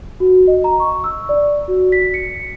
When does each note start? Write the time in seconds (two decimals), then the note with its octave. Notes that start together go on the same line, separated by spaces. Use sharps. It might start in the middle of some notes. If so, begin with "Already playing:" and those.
0.20 F#4
0.47 D#5
0.64 A#5
0.80 C#6
1.04 E6
1.29 D5
1.68 F#4
1.92 B6
2.14 C#7